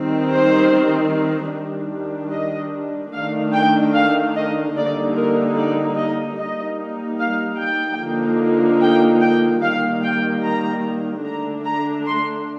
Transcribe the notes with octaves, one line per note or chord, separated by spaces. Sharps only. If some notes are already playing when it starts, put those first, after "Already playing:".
Already playing: D#3 G3 C4
C5
D#3 G3 D4
D#5
D#3 A3 D4 F5
G5
F5
D#5
D3 G3 A#3 D#4 D5
A#4
D5
D#5
G3 A#3 D#4 D#5
F5
G5
D3 F3 A#3 D#4
G5
G5
D#3 G3 A#3 F5
G5
A#5
D3 A3 D4 A#5
A#5
C6